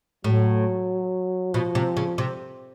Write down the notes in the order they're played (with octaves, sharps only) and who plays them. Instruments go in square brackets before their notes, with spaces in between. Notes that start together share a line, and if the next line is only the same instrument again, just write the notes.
[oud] A2 [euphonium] F#3
[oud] B2 [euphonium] F3
[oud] C3
C#3
C3